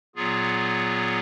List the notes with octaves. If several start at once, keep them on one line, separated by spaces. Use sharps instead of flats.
A#2 F#3 B3 F4 G#4